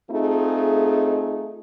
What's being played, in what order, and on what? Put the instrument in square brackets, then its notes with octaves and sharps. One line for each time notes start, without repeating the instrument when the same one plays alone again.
[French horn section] A3 C4 D#4 F4 G#4